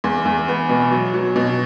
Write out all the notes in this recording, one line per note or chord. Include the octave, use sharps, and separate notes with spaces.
E2
E2
B3
B2
F#3
F#3
B2